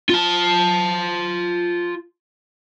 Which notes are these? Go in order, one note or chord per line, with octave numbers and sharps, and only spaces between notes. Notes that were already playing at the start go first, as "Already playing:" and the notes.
F4 A5